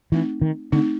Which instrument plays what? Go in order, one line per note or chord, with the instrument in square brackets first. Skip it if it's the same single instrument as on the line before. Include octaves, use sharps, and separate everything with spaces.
[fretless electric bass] E3 [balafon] A3 C4 D#4
[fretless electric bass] D#3
[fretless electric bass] D3 [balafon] A3 C4 D#4